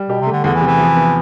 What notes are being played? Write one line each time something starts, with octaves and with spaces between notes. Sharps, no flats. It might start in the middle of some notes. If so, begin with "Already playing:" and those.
Already playing: G3
B2 G4
C3
A3
D3
E2 D3
E3
C3
E3
F3
B3